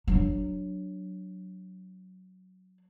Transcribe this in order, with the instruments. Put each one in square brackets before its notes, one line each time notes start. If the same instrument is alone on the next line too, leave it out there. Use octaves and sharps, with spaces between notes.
[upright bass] F#3 D4